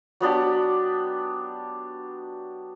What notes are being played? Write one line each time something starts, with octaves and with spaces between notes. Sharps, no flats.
F#3 B3 D4 G4